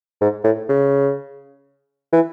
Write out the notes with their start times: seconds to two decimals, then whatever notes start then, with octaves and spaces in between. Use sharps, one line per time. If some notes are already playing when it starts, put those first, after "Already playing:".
0.21 G#2
0.44 A2
0.69 C#3
2.13 E3